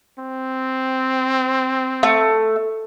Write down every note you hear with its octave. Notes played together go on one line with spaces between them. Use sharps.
C4
A3